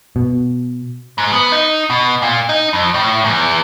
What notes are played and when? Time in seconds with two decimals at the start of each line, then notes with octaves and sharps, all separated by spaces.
0.16 B2
1.18 G#2
1.33 B3
1.52 D#4
1.90 B2
2.22 A#2
2.49 D#4
2.73 F2
2.94 A2
3.25 E2